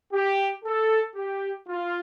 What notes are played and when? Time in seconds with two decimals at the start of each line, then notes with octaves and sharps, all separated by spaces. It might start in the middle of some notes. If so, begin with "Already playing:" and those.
0.13 G4
0.64 A4
1.16 G4
1.68 F4